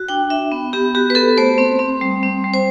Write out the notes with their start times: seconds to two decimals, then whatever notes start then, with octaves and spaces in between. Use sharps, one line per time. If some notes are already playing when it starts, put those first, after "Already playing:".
Already playing: F#4
0.09 D4 G5
0.30 D4 E5
0.52 B3
0.73 B3 G4
0.95 F#4 G4
1.10 B4
1.15 B3 A4
1.38 A3 C5
1.58 C4
1.79 C4
2.01 G3
2.23 C4
2.44 G3
2.53 C5